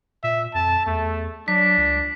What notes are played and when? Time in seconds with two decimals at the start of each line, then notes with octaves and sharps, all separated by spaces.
0.23 A#2 E5
0.54 F2 A5
0.86 E2 A3
1.48 F#3 D4 B6
1.78 C#2